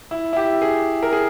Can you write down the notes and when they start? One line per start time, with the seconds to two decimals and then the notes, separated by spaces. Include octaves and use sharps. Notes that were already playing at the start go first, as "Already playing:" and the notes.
0.11 E4
0.33 E4
0.37 G4
0.62 G#4
1.03 A#4
1.13 G#4